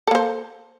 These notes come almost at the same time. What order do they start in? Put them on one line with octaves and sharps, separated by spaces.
A4 A#3 C5